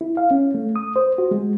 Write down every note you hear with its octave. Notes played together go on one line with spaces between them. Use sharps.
E4
F5
C#4
A3
D#6
C5
F#4
G#3